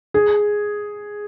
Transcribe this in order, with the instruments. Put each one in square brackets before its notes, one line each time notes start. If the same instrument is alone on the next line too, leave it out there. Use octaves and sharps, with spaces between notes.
[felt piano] G#4